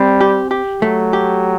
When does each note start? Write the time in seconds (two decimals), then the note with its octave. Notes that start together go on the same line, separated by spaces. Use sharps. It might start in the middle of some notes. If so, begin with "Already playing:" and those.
Already playing: G3 C4
0.21 G4
0.51 G4
0.82 F#3 A3
1.13 G4